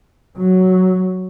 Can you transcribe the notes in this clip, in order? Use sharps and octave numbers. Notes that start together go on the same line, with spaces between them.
F#3